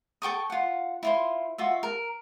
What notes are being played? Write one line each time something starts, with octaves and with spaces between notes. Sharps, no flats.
A4 G5 C#6 D#6
F4 F#5
E4 F4 C5
F4 F#4 E5
A#4